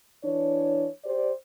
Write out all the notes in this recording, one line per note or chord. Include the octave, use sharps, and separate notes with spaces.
E3 D4 C#5
G4 C5 D5